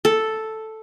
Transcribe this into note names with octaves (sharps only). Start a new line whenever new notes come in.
A4